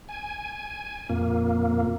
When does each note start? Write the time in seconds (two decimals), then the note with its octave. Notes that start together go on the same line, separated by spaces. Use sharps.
0.09 G#5
1.10 F2 A#2 A#3